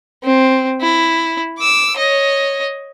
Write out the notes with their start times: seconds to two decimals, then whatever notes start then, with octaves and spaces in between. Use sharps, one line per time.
0.24 C4
0.81 E4
1.58 D6 E6
1.97 C#5 D#5